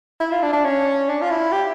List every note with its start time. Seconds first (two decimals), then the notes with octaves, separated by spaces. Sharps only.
0.20 E4
0.31 F4
0.42 D4
0.53 D4
0.65 C#4
1.09 D4
1.22 F4
1.31 E4
1.52 G4